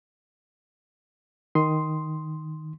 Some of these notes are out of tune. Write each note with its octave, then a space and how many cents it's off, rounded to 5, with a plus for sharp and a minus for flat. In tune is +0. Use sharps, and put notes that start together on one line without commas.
D#3 +0 C6 +0 D#6 +10